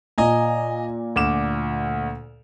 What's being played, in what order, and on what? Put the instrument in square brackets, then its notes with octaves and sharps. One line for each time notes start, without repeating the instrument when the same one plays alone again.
[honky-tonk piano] A#2 [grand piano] D#5 G#5 A#5
[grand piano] D2 D6 E7